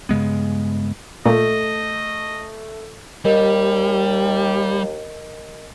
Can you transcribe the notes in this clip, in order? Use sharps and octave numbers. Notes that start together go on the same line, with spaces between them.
G2 C#3 G#3 B3
A#2 A3 D#5
D#2 G3 A#4 D#5